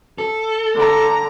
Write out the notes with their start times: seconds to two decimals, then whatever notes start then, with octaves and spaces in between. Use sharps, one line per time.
0.18 A4
0.75 D3 A#5